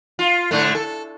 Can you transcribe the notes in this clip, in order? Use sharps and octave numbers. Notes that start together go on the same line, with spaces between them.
F4
G#2 D3 A3
A4